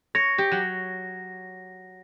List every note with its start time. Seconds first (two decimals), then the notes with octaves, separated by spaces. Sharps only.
0.15 C#5 A#6
0.38 G4
0.51 F#3